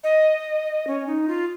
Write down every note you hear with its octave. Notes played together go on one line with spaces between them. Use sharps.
D#5
C#4
D#4
F4